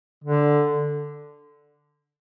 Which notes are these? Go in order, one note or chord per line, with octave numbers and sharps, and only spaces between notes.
D3